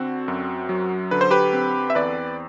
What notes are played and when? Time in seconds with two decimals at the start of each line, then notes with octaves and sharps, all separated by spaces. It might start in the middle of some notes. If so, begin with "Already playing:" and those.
Already playing: D3 C4 F#4
0.28 F#2
0.69 F#3
1.11 D3 B4
1.21 C5
1.31 G4 B4
1.53 C4
1.90 E5
1.95 E2 B4 D5